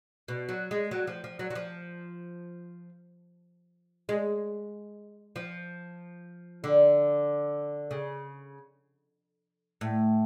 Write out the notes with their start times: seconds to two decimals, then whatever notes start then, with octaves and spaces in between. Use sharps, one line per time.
0.28 B2
0.49 F#3
0.71 G#3
0.91 F#3
1.07 F3
1.24 F3
1.39 F#3
1.50 F#3
1.55 F3
4.09 G#3
5.36 F3
6.64 D3
7.91 C#3
9.81 A2